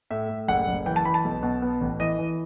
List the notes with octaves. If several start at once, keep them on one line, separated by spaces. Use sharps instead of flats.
A2 E5
A2
F#1 F#5
F#1
E3 G5
A5
E3 B5
A5
B1
B2
B3
A1
E3 D#5
E3